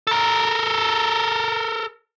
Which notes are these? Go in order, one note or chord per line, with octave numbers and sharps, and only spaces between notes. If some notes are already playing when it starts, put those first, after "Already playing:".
A4 A#4